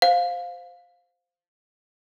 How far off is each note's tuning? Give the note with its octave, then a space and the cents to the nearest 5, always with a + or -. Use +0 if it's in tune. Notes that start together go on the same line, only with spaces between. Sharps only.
C5 -10 F5 +15